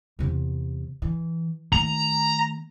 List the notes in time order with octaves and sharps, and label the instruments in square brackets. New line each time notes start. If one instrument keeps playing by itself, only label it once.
[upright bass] E2 C3
E3
[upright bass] D#3 A3 [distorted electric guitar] A#5